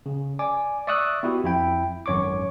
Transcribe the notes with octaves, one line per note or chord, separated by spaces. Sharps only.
C#3
D5 G#5 D6
D5 E5 C#6 D#6 E6 F#6
B3 E4 F#4 G4
F2 E4 G5
G#1 F#2 C#5 C#6 D6